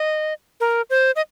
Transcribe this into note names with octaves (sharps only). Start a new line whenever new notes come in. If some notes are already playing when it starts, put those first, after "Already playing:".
Already playing: D#5
A#4
C5
D#5